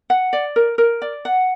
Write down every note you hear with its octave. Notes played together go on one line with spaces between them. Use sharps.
F#5
D5
A#4
A#4
D5
F#5